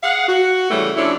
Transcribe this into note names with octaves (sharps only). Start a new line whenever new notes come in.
G#4 F5 F#5
F#4
C#3 E3 G3 A3
F2 C#4 D4 E4